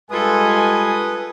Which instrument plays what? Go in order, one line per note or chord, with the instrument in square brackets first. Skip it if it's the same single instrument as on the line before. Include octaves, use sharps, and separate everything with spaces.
[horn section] G2 G#3 G#5 [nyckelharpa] F4 A4 [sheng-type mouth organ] B4 D#6